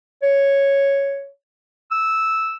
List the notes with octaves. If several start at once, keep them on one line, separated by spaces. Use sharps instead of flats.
C#5
E6